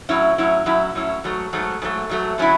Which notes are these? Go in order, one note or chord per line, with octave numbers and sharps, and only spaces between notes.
A2 F#3 C#4 E4
A2 F#3 C#4 E4
A2 F#3 C#4 E4
A2 F#3 C#4 E4
G#2 F#3 A3
G#2 F#3 A3
G#2 F#3 A3
G#2 F#3 A3
D3 F#3 C#4 E4